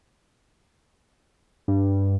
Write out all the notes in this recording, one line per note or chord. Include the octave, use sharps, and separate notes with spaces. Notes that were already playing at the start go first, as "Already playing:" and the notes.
G2